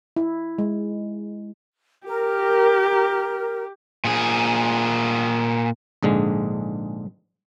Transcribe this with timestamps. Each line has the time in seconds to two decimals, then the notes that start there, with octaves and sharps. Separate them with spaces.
0.16 E4
0.58 G#3
2.07 G4 A#4
4.05 A#2 G#4
6.03 A#1 G#2 D3 G#3